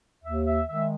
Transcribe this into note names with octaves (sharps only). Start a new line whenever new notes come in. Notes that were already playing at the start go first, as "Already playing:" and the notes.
D#2 E5
E5
D#3 G#3 E5